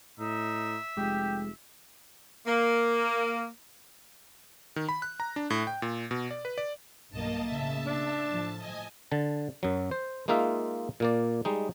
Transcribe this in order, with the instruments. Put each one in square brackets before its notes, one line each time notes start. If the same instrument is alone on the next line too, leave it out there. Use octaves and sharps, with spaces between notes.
[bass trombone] A2 [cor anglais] D#4 [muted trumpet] E5
[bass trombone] F1 [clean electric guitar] G#3 [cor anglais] G4
[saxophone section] A#3
[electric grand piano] D#3
B5
F#6
A#5
D4
A2
G5
A#2
B2
D5
B4
D5
[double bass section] B1 G2 [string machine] A#3 D#5 A5
[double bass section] A2 C#3 [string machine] E5 A5
[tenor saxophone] D4
[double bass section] A2 F3 [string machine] A5
[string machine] D#5 G#5
[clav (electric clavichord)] D3 A5
F#2 F#3
C5
G#3 A#3 D#4 F4 E5
A#2 A#3 D5
G3 G#3 D#4